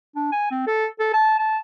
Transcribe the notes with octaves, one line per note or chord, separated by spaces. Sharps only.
D4
G#5
C4
A4
A4
A5
A5